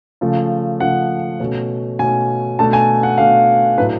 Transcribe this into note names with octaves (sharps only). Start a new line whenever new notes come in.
C#3 F3 A3
C#3 F3 A3 F#5
B2 A3 C#4
B2 A3 C#4 G#5
B2 A3 D4 A5
G#5
F#5
B2 A3 D4 F5
A2 F#3 A3 D4 B4